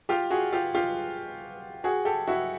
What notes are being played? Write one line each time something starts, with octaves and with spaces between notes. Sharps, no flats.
F4 G4
F#4 G#4
F4 G4
F4 G4
F#4 G#4
G4 A4
E4 F#4